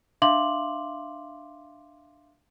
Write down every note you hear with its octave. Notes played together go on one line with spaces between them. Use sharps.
D4 E5 F5 C6 D6 F#7